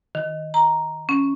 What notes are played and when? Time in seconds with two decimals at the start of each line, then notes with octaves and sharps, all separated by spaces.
0.15 D#3
0.54 A#5
1.09 C#4